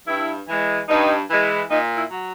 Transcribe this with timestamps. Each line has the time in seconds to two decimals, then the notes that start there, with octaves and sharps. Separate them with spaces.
0.08 G2 E4
0.48 E3 G#3
0.89 G2 D#4
1.30 E3 G#3
1.70 A#2 D#4
1.97 E4
2.11 F#3